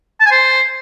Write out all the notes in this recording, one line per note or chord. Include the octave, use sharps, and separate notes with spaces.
A5
G#5
C5